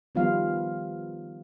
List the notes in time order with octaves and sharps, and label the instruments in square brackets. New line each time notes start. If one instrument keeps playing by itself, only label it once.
[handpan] D#3 F3 G3 B3 F4 F5